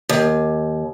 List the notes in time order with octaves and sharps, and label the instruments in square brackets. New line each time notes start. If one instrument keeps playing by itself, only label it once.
[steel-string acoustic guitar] D#2